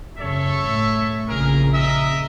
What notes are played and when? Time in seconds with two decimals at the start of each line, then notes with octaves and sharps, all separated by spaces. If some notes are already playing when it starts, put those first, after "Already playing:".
0.18 F#2 C#3 A4 C#5 E5
0.63 A2 A3
1.28 A#1 C#3 G#4 A#4
1.73 A#4 D#5 E5